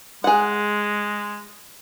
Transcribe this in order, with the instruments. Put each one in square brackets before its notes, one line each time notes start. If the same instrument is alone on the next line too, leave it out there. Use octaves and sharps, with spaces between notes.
[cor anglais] G#3 [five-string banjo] G#4 F#5